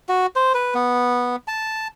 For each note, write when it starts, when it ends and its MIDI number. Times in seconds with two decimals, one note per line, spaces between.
0.09 0.26 66
0.36 0.53 72
0.54 0.74 71
0.75 1.36 59
1.48 1.88 81